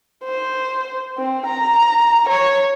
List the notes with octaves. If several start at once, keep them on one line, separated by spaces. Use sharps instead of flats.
C5
C4
A#5
C#5